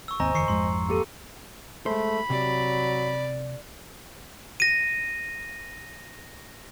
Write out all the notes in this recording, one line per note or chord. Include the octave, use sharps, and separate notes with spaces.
C#6 E6
G#1 D#2 C4 C5 D#5 G#5 A#5
F1 D#3 C#6 C7 C#7
G#1 F2 G#3 C6
A#3 G4 A4
G#3 A3 C5 B5
C3 F#3 D5
A#6 D#7